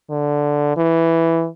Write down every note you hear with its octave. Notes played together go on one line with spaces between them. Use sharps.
D3
E3